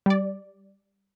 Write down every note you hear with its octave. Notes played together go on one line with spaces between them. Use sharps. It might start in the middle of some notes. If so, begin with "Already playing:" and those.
G3 D5